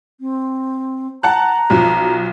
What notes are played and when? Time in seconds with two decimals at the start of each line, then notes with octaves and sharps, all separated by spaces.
0.20 C4
1.23 F#5 A5 A#5 F#6
1.70 B1 F3 F#3